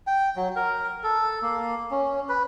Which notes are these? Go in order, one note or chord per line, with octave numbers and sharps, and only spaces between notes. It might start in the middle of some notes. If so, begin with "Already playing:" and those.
G5
F#3
A#4
A4
A#3
C#4
B4